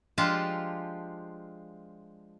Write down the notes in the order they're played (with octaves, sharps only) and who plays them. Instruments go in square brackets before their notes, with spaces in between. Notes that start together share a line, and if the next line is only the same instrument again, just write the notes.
[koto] F3 G#3 D4 F4 G4 A5